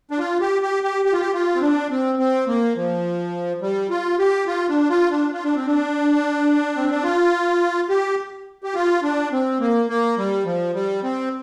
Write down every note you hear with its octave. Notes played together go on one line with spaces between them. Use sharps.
D4
F4
G4
G4
G4
G4
F4
G4
F4
C4
D4
C4
C4
A#3
F3
G3
F4
G4
F4
D4
F4
D4
F4
D4
C4
D4
C4
D4
F4
G4
G4
F4
D4
C4
A#3
A#3
G3
F3
G3
C4